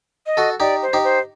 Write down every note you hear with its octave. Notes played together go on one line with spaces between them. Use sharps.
D#5
F#4 A4
D#4 G4 D5
C5
D#4 G4
C5